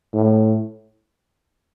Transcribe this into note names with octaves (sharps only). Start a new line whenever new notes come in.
A2